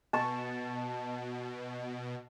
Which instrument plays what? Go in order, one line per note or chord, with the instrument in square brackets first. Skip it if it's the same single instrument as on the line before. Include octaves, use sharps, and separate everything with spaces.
[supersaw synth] B2 [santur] A5 C#6